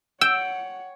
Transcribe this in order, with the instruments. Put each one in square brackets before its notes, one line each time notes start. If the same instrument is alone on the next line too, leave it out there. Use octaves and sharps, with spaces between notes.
[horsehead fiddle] C#5 F#5 [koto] G5 [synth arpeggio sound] E6